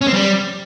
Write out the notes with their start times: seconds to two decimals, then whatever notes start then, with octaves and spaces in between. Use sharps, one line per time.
0.01 C#4
0.08 C4
0.14 G3